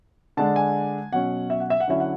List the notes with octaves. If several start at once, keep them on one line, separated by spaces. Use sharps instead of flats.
D3 G#3 D4 A5
G#5
B2 F#3 C#4 F#5
E5
F#5
E5
F#5
D3 F#3 C#4 E4 E5
F#5